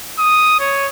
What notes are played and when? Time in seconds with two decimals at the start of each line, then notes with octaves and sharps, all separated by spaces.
0.19 D#6
0.60 C#5